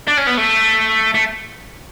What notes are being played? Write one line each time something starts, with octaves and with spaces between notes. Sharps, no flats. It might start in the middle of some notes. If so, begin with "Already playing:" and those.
D4
C#4
B3
A3
A3